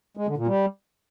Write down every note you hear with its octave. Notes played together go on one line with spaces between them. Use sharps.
G#3
D3
A#2
G3